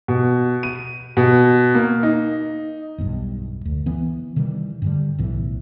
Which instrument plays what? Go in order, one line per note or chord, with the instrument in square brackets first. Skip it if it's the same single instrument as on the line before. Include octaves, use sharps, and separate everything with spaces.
[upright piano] B2
D#7
B2
A#3
D#4
[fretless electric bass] E1 B1 G2
D2
E3 B3
C3 D#3 E3 G3
G2 D3 G3
B1 A2 E3